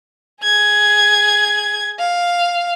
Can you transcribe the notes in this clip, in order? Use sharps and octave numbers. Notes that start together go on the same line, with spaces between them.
G#4 G#6
F5